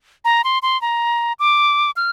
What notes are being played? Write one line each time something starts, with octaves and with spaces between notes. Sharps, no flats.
A#5
C6
C6
A#5
D6
F6